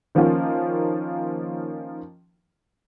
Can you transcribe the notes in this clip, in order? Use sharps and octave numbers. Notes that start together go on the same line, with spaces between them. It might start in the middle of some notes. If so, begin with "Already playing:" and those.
D#3 F3 A#3 C#4 F4